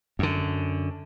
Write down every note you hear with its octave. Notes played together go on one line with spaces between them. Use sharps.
F#2 D3